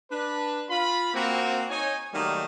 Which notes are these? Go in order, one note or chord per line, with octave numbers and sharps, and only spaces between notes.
D4 B4
F4 B5
A#3 C4 F#4
D#4 C#5 G#5
D#3 F#3 G3 A3 A#3 D#4